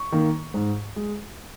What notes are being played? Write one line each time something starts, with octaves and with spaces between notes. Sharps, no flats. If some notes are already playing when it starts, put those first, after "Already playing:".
Already playing: C#6
D#3 A#3
G#2
G#3